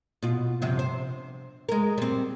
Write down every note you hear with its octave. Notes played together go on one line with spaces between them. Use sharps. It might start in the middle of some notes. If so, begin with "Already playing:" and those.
B2 F4
G2 C3 F3
C5
G#3 A#4
G3 C4